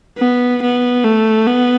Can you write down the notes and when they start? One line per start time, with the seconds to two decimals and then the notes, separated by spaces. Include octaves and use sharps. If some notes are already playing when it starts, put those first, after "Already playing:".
0.18 B3
0.62 B3
1.04 A3
1.47 B3